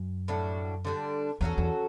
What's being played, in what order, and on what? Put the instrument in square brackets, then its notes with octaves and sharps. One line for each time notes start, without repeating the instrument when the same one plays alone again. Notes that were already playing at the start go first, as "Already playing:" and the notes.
Already playing: [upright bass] F#2
[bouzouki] A2 G3 D4 F#4
D3 G3 D4
[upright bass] E2 [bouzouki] F#3 C#4 F#4 A4
[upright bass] E2